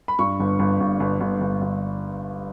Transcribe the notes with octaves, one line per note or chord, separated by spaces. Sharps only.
B5
G2 C#6
G1
G1
G1
G1
G1
G1
G1